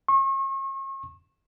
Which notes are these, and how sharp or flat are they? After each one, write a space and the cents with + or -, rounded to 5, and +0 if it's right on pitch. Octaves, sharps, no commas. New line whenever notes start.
C#6 -40